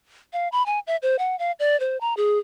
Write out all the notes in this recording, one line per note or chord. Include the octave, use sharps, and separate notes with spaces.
F5
B5
G#5
E5
C5
F#5
F5
D5
C5
A#5
G#4